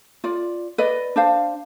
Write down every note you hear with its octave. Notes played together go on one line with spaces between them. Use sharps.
F4 D5
B4 D5 D#5
D4 C5 F5